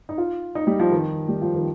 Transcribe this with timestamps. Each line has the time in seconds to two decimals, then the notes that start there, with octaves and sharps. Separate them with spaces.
0.09 D#4
0.18 F4
0.55 D#4
0.67 G3
0.80 F3
0.92 D#3
1.28 G3
1.42 F3
1.54 D#3